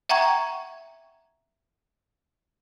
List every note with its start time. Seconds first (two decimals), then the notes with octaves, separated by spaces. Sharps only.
0.09 E5 F#5 G5 A#5 C#6 G#6